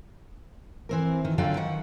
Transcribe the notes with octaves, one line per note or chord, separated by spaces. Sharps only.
E3 C4 A#4
D#3
F#2 D3 F#3 F4 F5 G5
D#3 F#5